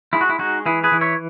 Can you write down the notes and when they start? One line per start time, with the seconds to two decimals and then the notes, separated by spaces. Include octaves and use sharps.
0.13 G#3 E4
0.21 F#4
0.29 E4
0.39 G#3 D#4 F#4
0.66 E3 E4 G#4
0.84 G#4 B4
0.92 E3
1.01 C#5 E5